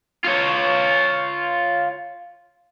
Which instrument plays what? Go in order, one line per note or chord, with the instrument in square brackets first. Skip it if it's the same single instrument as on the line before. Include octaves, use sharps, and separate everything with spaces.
[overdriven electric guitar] F4 C#5